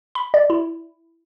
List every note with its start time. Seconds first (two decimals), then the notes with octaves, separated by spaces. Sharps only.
0.15 B5
0.34 D5
0.50 E4